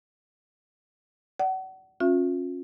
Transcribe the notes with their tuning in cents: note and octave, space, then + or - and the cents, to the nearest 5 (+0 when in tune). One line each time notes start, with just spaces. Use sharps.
D5 +0 F#5 +35
C#4 -30 F4 +40 E5 +35